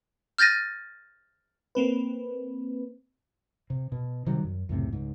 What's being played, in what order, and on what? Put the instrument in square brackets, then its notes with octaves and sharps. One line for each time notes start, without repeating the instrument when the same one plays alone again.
[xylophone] F6 G6 A6 A#6 D#7
[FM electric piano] A#3 C4 B4
[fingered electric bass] C3
B2
C3 D#3 F#3 G3
F#2
C#2 F#2 A2 C3
C#2 G#2